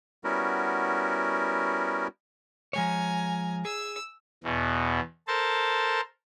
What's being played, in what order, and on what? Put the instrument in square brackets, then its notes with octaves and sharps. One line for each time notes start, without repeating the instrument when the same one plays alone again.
[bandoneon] G3 B3 C#4 E4 F#4 A#4
[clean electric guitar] F3 G#3 C#5 [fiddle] G#5 A#5
[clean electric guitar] G#4 [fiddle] E6
[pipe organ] E2 B2
A4 A#4 C5 A5